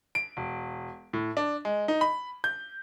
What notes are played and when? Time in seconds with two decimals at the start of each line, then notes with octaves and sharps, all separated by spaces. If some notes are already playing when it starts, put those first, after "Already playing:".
0.15 D7
0.37 E1
1.13 A2
1.37 D4
1.65 G#3
1.88 D#4
2.01 B5
2.44 G6